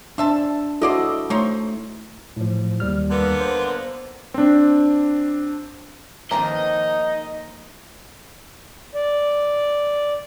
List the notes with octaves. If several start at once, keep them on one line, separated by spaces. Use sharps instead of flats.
D4 C5 E5 A5
E4 F#4 A4 C5 D5 D#5
A3 D#4 C5 C#5
A2 F3
D#2 G3 F6
D3 A#3 B3
C5
C4 D4
D#3 F3 A#3 C4 D#4 B4 D#5 A#5
D5